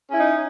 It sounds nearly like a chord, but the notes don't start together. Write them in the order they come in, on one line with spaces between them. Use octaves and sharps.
C#4 E4 D#4